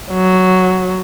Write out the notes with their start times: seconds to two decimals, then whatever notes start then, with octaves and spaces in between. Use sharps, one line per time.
0.12 F#3